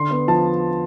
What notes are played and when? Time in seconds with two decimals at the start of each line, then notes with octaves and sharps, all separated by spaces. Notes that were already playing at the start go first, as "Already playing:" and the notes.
Already playing: D3 C6
0.11 B3
0.28 F3 A5